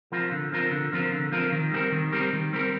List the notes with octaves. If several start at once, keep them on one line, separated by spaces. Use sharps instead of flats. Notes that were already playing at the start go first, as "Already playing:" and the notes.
F3 C4 F4 A#4
D3
F3 C4 F4 A#4
D3
F3 C4 F4 A#4
D3
F3 C4 F4 A#4
D#3
G3 C4 G4 A#4
D#3
G3 C4 G4 A#4
D#3
G3 C4 G4 A#4